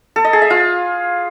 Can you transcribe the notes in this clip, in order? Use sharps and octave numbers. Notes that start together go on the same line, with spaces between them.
A4
D#5
G#4
E5
F4